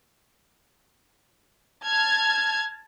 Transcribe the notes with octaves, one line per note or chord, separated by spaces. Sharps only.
A5 F6 G#6